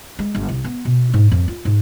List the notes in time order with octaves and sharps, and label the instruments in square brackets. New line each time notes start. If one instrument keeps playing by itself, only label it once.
[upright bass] G#3
G1
C2
B3
B2
G#2
F2
F4
G#2